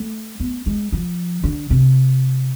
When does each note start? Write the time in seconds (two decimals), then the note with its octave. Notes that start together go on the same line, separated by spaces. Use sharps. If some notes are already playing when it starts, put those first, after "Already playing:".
Already playing: A3
0.40 B3
0.66 G#3
0.92 F3
1.43 D3
1.70 C3